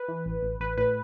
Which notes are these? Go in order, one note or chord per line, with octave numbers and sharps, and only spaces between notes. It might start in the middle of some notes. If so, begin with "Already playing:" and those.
Already playing: B4
E3
A1
A1
A1 B4
A2 B4